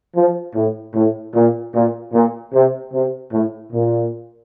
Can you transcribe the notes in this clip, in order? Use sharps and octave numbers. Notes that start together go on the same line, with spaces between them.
F3
A2
A2
A#2
A#2
A#2
C3
C3
A2
A#2